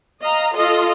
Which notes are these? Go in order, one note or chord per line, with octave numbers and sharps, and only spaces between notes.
D#5 F5 A#5
F4 A4 D#5 F5